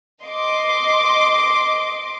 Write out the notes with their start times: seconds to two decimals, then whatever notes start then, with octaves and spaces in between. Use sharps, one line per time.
0.23 D#5 C6 D6